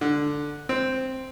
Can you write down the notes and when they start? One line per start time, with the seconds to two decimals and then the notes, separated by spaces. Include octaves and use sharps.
0.01 D3
0.69 C4